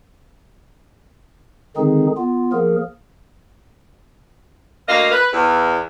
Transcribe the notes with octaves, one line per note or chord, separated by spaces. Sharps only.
D3 D#3 G#3 C4 D#4 G#4
B3 F4
F3 A#3 G#4 A#4
D2 A#3 D#5 F5
B4
E2